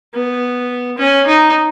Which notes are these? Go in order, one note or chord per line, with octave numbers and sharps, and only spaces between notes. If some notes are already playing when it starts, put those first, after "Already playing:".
B3
C#4
D#4